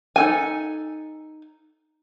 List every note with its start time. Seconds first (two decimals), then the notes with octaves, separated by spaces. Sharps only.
0.16 D#4 A4 G#5